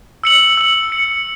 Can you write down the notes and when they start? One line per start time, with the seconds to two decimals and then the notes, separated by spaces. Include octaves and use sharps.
0.24 E6 C#7 F#7
0.57 E6 C#7 F#7
0.90 E6 C#7 F#7